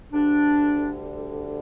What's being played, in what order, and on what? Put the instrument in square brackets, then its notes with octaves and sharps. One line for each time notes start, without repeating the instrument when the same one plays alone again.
[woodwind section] D2 D3 G3 D4